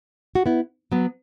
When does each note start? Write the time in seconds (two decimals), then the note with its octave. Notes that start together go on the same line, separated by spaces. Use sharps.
0.35 F#4
0.46 B3 E4
0.92 F#3 B3